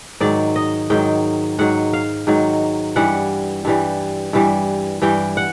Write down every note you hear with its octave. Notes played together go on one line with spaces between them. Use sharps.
G#2 D#3 F#3 D5
D#5
G#2 D#3 F#3 G5
G#2 D#3 F#3 F#5
F5
G#2 D#3 F#3
G2 E3 G3 F#5
G2 E3 G3
G2 E3 G3
G2 E3 G3 G5
F#5